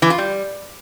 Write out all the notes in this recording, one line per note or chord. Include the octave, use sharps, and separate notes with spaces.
E3
F4
G3